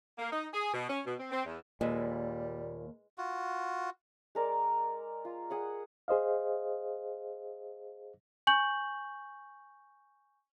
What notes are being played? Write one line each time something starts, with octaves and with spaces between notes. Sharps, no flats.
A#3
D#4
G#4
B2
C#4
B2
C4
C4
E2
D#2 A#2 G3 G#3 B4 E5
F4 F#4
G#3 A#4 D5
F4
G#4 F#5 D#6
G#4 C5 D#5 F5
G#5 C#6 G6 F#7